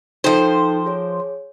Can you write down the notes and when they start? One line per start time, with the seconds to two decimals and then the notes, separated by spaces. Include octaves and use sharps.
0.24 F3 D#4 A4 C5 G5
0.86 G#4 C#5